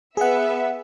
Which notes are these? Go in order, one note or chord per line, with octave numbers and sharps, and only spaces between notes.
B3 G#4 E5 F#5